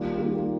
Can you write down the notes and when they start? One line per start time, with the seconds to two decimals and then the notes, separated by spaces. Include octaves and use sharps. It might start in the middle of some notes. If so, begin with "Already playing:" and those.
Already playing: D#3 G3 A#3 F4
0.18 D#3 G3 A#3 F4